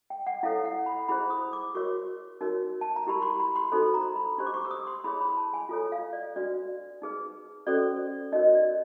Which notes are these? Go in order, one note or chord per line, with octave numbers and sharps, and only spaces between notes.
G5
F#5
E4 A4 C#5 F5
F#5
B5
E4 G#4 C5 B5
D#6
D6
F#4 A#4 C#5 C#6
D#4 F#4 A#4 C#5
A5
A#5
E4 G4 A#4 B5
C6
B5
C6
D#4 F#4 A4 C5 B5
A#5
B5
D4 G4 C5 C6
D6
C#6
E6
D#6
C6
E4 G#4 C#5 B5
B5
A5
G#5
F4 A4 C#5
F5
D5
D4 F#4 B4 D5
D#4 G#4 B4
C#4 F#4 A4 C5 D5
D#4 F#4 A#4 C#5 D#5
D5